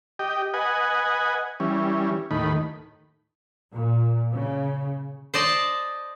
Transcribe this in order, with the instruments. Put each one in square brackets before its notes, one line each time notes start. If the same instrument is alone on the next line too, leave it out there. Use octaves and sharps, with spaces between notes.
[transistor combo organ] G4 D#5 G5
B4 D#5 F#5 G#5
E3 G3 C#4
D#2 A2 D#3 B5
[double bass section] A#2
C#3
[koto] C5 D5 D#5 A5